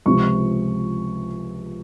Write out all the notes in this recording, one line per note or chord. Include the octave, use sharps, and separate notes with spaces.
C#2 C3 F3 C#6